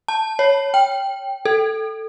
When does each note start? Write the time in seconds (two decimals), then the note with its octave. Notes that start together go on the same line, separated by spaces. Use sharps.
0.08 A5
0.39 C#5
0.74 G5
1.45 A4